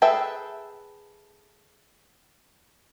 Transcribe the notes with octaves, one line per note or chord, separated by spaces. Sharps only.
G#4 A4 B4 E5 G5